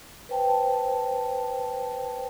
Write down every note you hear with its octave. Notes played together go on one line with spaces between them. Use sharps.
B4 C5 G5 A5